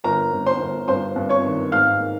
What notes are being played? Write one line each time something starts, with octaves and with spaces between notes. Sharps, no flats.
G1 A#4 A#5
G1
C5 C6
G1
G2 C5 C6
G2
C#5 C#6
D#3
G#2 F5 F6
A#3